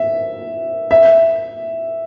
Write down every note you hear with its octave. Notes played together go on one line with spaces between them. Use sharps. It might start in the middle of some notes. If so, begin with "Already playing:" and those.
Already playing: E5
E5